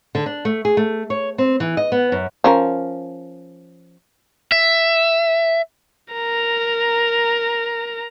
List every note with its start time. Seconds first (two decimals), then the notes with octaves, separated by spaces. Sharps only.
0.15 D3
0.26 D4
0.45 A3
0.65 G#4
0.77 A3
1.10 C#5
1.38 C4
1.60 E3
1.77 D#5
1.92 B3
2.12 F#2
2.44 F3 C#4 A#4
4.52 E5
6.12 A#4 A#5